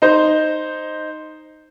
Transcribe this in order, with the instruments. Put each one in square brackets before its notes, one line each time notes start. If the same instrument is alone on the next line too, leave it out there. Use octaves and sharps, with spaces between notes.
[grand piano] D#4 C5